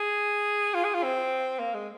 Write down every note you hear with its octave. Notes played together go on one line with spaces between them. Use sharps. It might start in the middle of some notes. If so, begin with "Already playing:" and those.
Already playing: G#4
F4
G#4
F4
C4
A#3
G#3